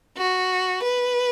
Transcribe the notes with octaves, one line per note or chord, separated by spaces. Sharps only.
F#4
B4